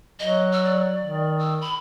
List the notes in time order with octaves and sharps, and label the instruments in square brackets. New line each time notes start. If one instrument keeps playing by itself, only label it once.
[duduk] F#3 [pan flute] D#5
[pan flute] E6
D5
[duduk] D#3
[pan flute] E6
B5